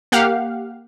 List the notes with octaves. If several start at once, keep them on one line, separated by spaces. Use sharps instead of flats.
A#3 G4 F5 F#5